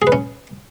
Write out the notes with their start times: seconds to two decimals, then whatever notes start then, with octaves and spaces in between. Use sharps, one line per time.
0.02 G#4
0.07 B4
0.12 C#4